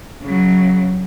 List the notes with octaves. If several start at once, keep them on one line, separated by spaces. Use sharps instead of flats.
C#3 F#3